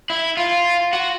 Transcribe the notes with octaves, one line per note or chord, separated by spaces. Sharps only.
E4
F4
F#4